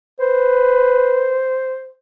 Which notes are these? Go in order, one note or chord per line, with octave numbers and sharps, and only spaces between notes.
B4 C5